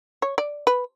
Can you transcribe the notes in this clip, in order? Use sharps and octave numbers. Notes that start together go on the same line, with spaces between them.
C#5
D5
B4